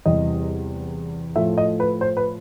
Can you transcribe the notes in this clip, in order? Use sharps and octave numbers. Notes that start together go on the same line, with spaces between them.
E2 C3 E3 G3 D#5
A2 F3 A3 E5
D#5
B4
C5
B4